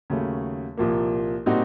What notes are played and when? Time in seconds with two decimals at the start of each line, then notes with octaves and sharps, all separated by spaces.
0.10 D#2 C#3 F#3 A3
0.77 C2 A#2 F3 A#3
1.46 A#2 G3 C4 D#4 F#4